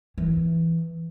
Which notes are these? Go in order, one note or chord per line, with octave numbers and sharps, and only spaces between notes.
E3